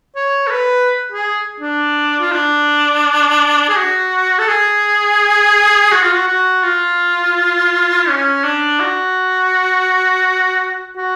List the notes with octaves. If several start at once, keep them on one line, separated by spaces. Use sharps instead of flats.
C#5
A4
B4
G#4
D4
F4
D4
G#4
F#4
A4
G#4
F#4
F4
F#4
F#4
F4
C#4
D4
F#4
F#4